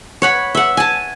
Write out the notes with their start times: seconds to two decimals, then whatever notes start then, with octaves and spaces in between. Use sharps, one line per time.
0.22 C#5 F#5 B5
0.55 E5 F#5
0.77 G#5 A5